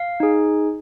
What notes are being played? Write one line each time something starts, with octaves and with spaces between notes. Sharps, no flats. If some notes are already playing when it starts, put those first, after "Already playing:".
Already playing: F5
D#4 G#4